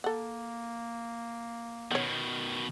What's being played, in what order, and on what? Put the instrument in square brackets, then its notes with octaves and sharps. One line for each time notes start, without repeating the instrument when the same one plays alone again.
[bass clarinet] A#3 [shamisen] A4 F#5
[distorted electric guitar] B2 D#3 [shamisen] B3 C#5